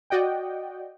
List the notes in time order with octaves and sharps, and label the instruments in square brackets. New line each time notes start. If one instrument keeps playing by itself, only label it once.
[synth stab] F#4 D5 D#5 F#5 G5